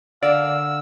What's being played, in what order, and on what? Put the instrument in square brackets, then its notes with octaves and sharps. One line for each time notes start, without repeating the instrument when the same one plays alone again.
[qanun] D3 A#4 F#5 [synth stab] D5 [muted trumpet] F5 [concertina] E6